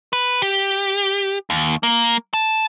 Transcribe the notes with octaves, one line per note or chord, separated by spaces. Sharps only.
B4
G4
D#2
A#3
A5